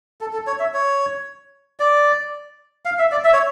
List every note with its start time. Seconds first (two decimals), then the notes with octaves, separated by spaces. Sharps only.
0.21 A4
0.33 A4
0.47 C#5
0.60 E5
0.74 C#5
1.80 D5
2.85 F5
2.99 E5
3.12 D5
3.24 E5
3.33 C#5